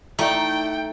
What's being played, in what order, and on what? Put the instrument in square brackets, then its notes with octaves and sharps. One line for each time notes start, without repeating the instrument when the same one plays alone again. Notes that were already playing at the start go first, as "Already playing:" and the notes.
[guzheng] A3 [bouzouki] D#4 A#5 [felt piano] E4 D5 E5 [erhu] G5